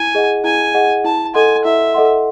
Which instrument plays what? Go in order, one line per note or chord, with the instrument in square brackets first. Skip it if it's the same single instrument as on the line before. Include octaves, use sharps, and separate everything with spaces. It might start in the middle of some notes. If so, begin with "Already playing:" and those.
Already playing: [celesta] E4 [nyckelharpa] G#5
[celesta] G#4 D#5 F#5
[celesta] E4 [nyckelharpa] G#5
[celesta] G#4 D#5 F#5
[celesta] E4 [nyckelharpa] A5
[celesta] A4 D#5 F#5 C6 [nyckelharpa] G#5
[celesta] E4 [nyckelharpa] E5
[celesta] A4 D#5 F#5 C6